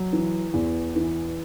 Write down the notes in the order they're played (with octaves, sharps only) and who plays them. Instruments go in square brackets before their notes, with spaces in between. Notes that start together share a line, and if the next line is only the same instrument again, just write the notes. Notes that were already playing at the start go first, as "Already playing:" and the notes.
Already playing: [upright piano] F#3
E3
E2
E3